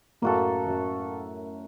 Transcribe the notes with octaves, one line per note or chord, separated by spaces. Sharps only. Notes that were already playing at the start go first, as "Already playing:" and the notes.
F#2 A2 A#3 F#4 A4
F#2